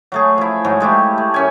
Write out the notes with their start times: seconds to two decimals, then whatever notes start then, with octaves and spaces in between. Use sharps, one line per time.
0.12 F#3 A3 G#4
0.38 F3 E4
0.64 G#2 F3 F#3
0.80 G#3 A3 E4 G4
1.18 A3
1.34 F#2 C#4 G#5